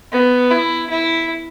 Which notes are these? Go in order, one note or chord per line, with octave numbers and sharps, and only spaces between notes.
B3
E4
E4